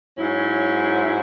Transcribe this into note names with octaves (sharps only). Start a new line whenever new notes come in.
G#2 F#3 C#4 E4